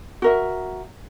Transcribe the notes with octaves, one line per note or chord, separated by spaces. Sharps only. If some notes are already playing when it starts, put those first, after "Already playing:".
F#4 A#4 E5